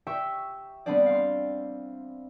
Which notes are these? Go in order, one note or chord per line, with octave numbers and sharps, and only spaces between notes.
G4 E5 G5 C#6 E6
G3 B3 C4 D4 C5 D5
F5 C6